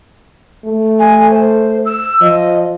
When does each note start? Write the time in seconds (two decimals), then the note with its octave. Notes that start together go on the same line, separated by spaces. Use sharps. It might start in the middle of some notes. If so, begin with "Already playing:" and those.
0.65 A3
0.99 G#5
1.31 C5
1.86 E6
2.21 F3 D#5